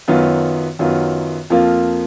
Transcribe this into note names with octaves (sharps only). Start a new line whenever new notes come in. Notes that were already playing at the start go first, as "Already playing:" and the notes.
F#2 D#3 F#3 B3 F4
F#2 D#3 F#3 B3 F4
F2 F3 A#3 F4